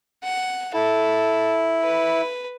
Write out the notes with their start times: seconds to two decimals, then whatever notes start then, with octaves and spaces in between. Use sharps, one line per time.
0.24 F#5
0.74 E4 A4
1.83 B4